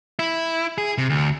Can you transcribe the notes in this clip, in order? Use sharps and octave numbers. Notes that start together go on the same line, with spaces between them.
E4
G#4
C3
D2